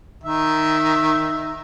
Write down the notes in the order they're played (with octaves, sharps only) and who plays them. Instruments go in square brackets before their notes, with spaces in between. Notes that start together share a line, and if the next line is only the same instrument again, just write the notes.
[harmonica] D#3 E5